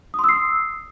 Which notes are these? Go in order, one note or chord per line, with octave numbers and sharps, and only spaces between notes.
C6 D#6 E6 C7